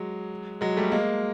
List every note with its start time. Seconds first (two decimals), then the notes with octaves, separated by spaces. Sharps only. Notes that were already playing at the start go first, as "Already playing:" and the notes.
Already playing: F#3 G#3
0.61 F#3 G#3
0.77 G3 A3
0.92 G#3 A#3